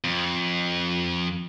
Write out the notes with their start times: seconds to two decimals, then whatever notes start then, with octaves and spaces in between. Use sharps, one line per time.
0.04 F2